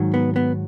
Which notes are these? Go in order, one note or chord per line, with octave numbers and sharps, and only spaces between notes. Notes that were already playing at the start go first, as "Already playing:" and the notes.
Already playing: G#2 D#3 F#3
B3
B3